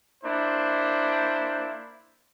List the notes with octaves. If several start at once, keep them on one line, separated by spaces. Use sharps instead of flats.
A#3 D4 E4 C5